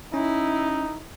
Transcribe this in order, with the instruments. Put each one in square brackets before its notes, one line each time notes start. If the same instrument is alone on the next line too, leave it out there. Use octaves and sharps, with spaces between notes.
[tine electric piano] C#4 [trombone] D#4 [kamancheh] E4